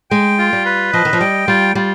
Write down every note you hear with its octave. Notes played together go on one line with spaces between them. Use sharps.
G#3 G5
F4
G3
B4
F3 D#5
D#3
F3
G3 G5
G3 F4
G3 F4